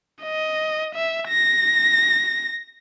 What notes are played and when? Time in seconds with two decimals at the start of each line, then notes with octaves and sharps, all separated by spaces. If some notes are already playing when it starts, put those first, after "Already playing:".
0.23 D#5
0.95 E5
1.28 A#6